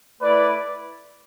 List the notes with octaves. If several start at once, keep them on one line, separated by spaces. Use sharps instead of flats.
A3 E4 B4 D5